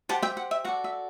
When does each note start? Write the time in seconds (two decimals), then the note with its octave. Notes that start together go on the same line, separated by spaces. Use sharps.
0.09 G4 C5 F#5 A5
0.22 E5 G5
0.37 F#5
0.51 E5
0.65 F#4 A4 D5 F#5
0.84 E5